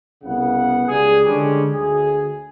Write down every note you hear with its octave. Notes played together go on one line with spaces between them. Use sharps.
C2 C#3 B3 F#5
C#2 G3 G#4
D3 G3 G#3 C#4 D4
D2 G#4